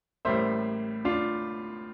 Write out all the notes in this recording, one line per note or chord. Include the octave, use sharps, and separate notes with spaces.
A1 A2 G3 A#3 C5 E5
D4 F4